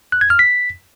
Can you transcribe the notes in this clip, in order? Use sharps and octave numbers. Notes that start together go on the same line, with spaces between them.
F#6
G#6
F6
B6